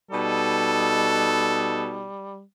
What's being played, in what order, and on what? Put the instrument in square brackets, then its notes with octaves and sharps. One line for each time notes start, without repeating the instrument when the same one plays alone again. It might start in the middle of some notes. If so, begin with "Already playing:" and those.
[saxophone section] B2 D#4 [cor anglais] G3 [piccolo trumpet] A4